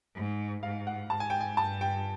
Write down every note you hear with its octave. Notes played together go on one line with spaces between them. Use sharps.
G#2
G#2 F5
F#5
G#2 A5
G#5
G5
G#5
G2 A5
G5